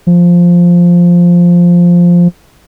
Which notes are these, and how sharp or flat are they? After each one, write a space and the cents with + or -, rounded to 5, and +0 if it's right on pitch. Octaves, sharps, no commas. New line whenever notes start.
F3 +0